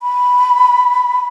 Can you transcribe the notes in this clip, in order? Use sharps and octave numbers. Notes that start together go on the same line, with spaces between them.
B5